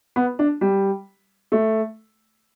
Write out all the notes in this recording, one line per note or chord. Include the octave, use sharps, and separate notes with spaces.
B3
D4
G3
A3